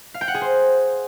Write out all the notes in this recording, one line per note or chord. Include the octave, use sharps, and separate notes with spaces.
F5
G5
F#5
G#4
C5